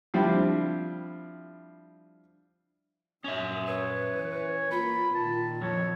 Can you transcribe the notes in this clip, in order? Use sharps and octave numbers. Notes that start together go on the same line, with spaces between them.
F3 G3 C4 D4 E4
F#2 A#2 C#4 E5 D#6
B4 C#5
E3
A#3 F4 B5
A#2 D#3 A5
F2 C#5